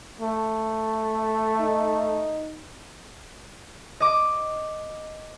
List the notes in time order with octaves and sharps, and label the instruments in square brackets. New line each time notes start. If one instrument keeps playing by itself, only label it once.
[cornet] A3
[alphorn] D#4
[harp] D#5 D6